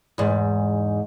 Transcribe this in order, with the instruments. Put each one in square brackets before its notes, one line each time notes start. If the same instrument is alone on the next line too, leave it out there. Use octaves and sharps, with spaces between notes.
[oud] E2 G#2